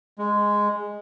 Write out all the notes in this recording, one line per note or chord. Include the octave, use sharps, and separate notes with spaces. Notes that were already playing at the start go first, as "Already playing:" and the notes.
G#3